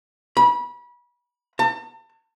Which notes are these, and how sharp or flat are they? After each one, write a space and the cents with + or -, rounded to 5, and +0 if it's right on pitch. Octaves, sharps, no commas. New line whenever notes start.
B5 -30
A5 +40